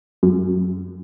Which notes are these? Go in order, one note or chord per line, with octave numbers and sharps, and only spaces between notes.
F#2